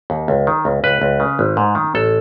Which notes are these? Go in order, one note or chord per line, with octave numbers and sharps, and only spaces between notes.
D#2
C#2
D#3
C#2
C#2 B4
C#2
C#3
G#1
G#2
D#3
A1 A4